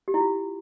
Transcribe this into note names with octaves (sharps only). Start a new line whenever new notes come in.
G4
E4
F4